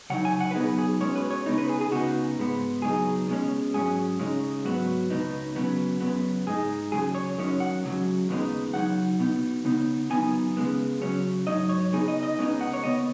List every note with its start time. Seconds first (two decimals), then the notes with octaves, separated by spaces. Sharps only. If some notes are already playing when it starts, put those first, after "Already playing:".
0.10 C#3 F#3 D#4 F#5
0.25 G#5
0.41 F#5
0.51 B4
0.55 B2 F#3 B3 D#4 G#4
0.78 G#4
1.00 B2 G#3 C#4 C#5
1.15 B4
1.31 C#5
1.46 C#3 B3 D#4
1.58 B4
1.69 G#4
1.81 G#4
1.91 C#2 C#3 B3 D#4 F#4
2.37 G#2 G#3 B3
2.82 C#2 B2 F#3 D#4 G#4
3.28 B2 G#3 C#4
3.74 G#2 F#3 C#4 G#4
4.19 C#3 G#3 D#4
4.65 G#2 F#3 B3 F#4
5.10 C#2 B2 B3 D#4
5.56 C#3 F#3 B3
6.01 F#2 C#3 B3
6.47 G#2 G#3 D#4 G#4
6.92 D#2 C#3 F#3 G#4
7.15 C#5
7.38 F#2 D#3 F#3 C#4
7.60 F#5
7.83 C#2 C#3 F#3
8.29 D#2 C#3 G#3 B3 D#4
8.74 C#3 F#3 D#4 F#5
9.19 B2 B3 D#4
9.65 C#3 B3 D#4
10.10 F#2 D#3 B3 D#4 G#5
10.57 C#3 G#3 B3
11.02 C#3 F#3 C#4
11.47 G#2 F#3 D#4 D#5
11.69 C#5
11.92 C#3 B3 D#4 G#4
12.08 D#5
12.23 D#5
12.38 C#2 C#3 B3 D#4
12.61 F#5
12.73 C#5
12.84 D#2 C#3 B3 D#5